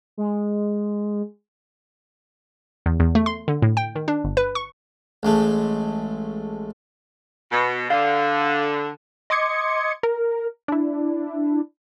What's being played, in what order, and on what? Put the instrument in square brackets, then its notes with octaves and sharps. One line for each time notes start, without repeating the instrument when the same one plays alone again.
[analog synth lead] G#3
[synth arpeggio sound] E2
E2
A3
C6
D3
A2
G5
D#3
D4
G1
B4
C#6
[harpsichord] A1 G#3 A3
[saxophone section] B2
[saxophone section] D3 [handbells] F5
[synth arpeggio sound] D#5 C6 D6 D#6 G#6 C#7
A#4
D4 E4